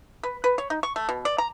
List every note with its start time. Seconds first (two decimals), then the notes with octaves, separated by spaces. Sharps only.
0.23 B4
0.44 B4
0.58 C#5
0.70 D#4
0.83 C#6
0.96 A3
1.09 B2
1.25 D5
1.38 A#5